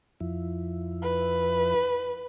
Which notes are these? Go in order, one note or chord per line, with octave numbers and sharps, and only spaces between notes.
F2 F3 E4
B4